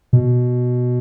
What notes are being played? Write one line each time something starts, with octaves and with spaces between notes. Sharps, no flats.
B2